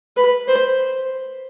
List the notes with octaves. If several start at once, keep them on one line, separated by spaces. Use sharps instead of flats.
B4
C5